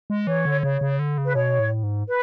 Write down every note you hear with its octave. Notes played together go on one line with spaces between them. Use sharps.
G#3
E3 C#5
D3
C#3 C#5
C#3
D3
C#3
B4
B2 C#5
A2
G#2
B4